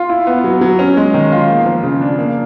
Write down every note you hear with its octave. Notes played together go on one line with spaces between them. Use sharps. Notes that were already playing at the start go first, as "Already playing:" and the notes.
Already playing: F4
E4
B3
F#3
F#3
C#4
G#3
D#3
F4
A#3
F3
C#3
D4
A#3